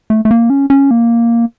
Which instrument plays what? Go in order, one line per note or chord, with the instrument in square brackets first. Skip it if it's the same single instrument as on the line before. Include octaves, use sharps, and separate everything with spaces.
[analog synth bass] A3
A3
A#3
C#4
C#4
A#3